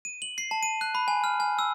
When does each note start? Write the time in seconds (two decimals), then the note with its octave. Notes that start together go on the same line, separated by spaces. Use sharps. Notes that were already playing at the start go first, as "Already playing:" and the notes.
0.05 D#7
0.22 F#7
0.38 C7
0.51 A5
0.63 D#7
0.81 F#6
0.95 B5
1.08 G#5
1.24 F6
1.40 G#5
1.59 E6